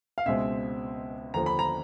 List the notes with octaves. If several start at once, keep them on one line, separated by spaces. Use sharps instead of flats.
F5
C#2 B2 G#3 C4 E5
D#2 D3 F3 A#5
B5
A#5